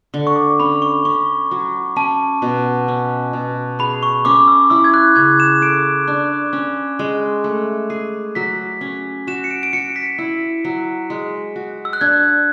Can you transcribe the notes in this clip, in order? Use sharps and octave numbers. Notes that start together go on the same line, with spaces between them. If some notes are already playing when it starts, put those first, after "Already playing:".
D3
C#6
D6
C#4 B5
C#6
C#4 C#6
F#3
C#4 A5
B2
C#4
B2
G#4 B5
C#6
C#4 D6
E6
E4 E6
G#6
F#6
C#3 G#6
E7
A4 D7
D4
C#4
G#3
A3
G#4
F#3 B6
C#4
F#4 E7
C#7
D7
D7
F#4 C#7
B6
E4
F#3
G#3
F#4
E6
F#6
D4 G#6